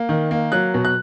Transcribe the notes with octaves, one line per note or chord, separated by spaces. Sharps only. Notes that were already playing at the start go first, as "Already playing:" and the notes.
Already playing: A#3
D#3
A#3
F#3 F#6
B2
F#6